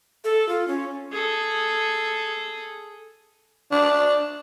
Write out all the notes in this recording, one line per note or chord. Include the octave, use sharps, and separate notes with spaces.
A4
F4
C#4
G#4 A4
D4